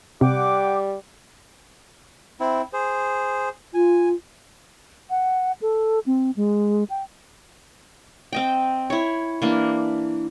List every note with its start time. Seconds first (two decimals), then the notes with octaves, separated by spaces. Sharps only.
0.21 C3 G3 F#5 G5 D6
2.40 C4 E4
2.73 G#4 C5
3.74 F4 G#5
5.10 F#5
5.62 A4
6.06 C4
6.36 G#3
6.90 G5
8.33 C4 D#5 G5
8.90 E4 C#5
9.42 E3 A#3 D4